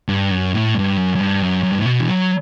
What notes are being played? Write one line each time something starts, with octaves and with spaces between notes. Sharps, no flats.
G2
F#2
A2
G2
F#2
F#2
G2
F#2
F#2
G2
A2
B2
E3
F#3